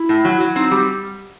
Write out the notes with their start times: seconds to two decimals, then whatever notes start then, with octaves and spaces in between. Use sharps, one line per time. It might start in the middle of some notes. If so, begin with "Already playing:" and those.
Already playing: E4
0.09 A2
0.25 F#3
0.40 F#3
0.56 C4 D#4
0.71 G3 G4